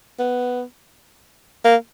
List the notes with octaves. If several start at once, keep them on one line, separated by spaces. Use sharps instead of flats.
B3
A#3